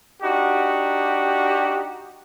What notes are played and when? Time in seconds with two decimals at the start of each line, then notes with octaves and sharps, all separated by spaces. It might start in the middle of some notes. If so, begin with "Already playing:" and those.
0.22 D4 D#4 F#4 G4